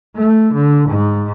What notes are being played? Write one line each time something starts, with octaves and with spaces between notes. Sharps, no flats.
A3
D3
G#2